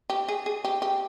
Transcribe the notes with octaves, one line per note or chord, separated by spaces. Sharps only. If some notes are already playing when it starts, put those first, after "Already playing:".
G4
G#4
G#4
G4
G4